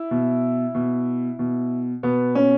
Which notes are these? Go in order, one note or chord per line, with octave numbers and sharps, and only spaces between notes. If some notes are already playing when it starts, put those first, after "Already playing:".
Already playing: E4
B2
B2
B2
B2 B3
C#4